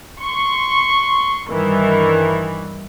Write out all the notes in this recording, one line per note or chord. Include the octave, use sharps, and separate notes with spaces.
C6 C#6
G2 D#3 E3